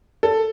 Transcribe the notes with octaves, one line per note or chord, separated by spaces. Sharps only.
A4